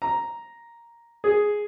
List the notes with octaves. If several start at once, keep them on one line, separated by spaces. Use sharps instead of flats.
A#5
G#4